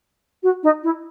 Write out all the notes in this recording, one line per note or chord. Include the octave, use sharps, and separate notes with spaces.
F#4
D#4
E4